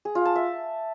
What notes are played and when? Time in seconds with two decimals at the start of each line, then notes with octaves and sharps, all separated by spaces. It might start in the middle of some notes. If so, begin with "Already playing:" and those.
0.05 G#4
0.15 F4
0.25 A5
0.36 E5